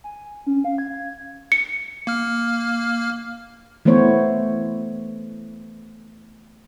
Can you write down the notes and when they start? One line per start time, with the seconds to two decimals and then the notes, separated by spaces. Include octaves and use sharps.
0.04 G#5
0.47 C#4
0.64 F5
0.78 G#6
1.52 C#7
2.07 A#3 F6
3.85 E3 A3 B3 C5 C#5